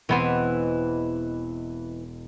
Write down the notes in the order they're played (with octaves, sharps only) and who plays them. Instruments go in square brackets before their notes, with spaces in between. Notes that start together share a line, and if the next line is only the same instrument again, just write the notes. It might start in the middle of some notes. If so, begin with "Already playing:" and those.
[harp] E1 D#5 D#7 [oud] E3 B3 C4